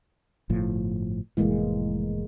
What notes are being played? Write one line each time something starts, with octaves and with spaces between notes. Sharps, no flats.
G1 A2 F3
F1 A2 E3 G#3 A#3